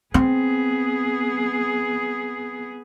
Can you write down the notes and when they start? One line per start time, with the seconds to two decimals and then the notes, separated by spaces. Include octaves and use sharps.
0.14 B3 C4 G#4